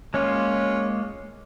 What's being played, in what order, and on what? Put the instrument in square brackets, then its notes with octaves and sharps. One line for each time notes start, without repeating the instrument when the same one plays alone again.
[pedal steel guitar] G#3 A#3 F4 [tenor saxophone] C#4